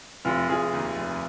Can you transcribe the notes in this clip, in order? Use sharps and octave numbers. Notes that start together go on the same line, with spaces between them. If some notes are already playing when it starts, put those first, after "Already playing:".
F1 F4
F1 F4 G#4
D#2
F1